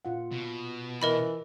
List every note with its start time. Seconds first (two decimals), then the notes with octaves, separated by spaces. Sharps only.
0.05 A#2 F4 F#5
0.31 B2
1.02 E3 A#4 D#5 B5